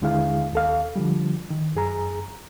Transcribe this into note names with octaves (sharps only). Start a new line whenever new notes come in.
D#2 D3 G#3 E4 G#4 F5
D#2 A4 F5
D3 F3 G3
D#3
F#2 G#4 A#5